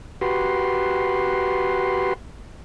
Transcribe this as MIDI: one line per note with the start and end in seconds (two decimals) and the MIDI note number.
0.21 2.14 66
0.21 2.14 67
0.21 2.14 71
0.21 2.14 84